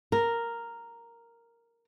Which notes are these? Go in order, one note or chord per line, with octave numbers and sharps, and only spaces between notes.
A#4